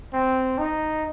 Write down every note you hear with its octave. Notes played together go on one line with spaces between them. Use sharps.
C4
D#4